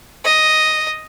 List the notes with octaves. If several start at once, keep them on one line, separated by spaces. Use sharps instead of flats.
D#5